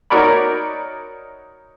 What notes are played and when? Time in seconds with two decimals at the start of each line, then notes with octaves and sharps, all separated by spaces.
0.10 D#4 F#4 A#4 C#5 D5 B5